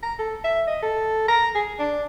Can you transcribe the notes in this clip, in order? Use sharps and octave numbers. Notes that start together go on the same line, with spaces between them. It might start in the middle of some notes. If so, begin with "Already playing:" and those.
A#5
A4
E5
D#5
A4
A#5
G#4
D4